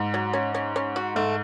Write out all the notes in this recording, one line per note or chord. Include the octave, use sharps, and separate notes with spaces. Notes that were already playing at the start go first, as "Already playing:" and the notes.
Already playing: G#2
F#3
C#4
C#4
C#4
F#4
G#2 A3